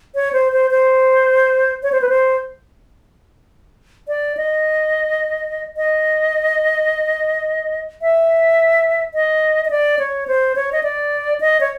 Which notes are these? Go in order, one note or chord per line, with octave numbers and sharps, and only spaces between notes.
C#5
C5
C5
C5
C#5
C5
B4
C5
D5
D#5
D#5
E5
D#5
D#5
D5
C#5
C5
C#5
D#5
D5
D#5
C#5